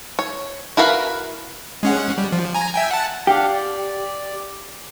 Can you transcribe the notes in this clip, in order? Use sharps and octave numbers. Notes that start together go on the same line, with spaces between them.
C#5
E4 F#4 A#4 B4 F5
G#3 C#4 F#5
G3
F3
G#5 A#5
E5 G5 G#5
F#5 A5
D4 G4 F5 F#5
D5